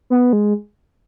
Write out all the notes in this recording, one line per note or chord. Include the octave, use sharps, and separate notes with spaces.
B3
G#3